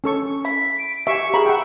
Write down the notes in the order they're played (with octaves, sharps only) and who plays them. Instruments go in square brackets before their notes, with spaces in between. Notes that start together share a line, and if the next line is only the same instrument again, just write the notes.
[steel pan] C#4 A4 C#6
[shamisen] E4 [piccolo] B6
[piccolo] D7
[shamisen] F#3 [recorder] G4 [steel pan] E5 G#5 [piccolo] C#6
[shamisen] F4 F#4 A#5 [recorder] G#4 [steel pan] B5
[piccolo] E5 [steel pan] F#5 G5